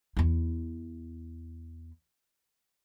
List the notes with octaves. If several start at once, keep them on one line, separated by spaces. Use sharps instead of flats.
E2 E4